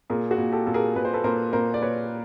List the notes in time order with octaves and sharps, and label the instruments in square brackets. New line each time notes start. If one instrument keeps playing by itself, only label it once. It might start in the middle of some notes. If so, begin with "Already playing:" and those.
[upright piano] A#2 G#4 A#4
F#4 G#4
A#2
G4 A4
A#2 A4
G#4 A#4
A#2 B4
C5
A4 B4
A#2 A#4 C5
A#2 A#4 C5
D5
A#2 B4 C#5